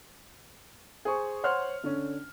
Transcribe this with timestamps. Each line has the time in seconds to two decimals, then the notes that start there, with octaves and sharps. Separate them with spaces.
1.05 G#4 C5 C#6
1.43 C5 C#5 F#5 C6 F6
1.84 D3 C#4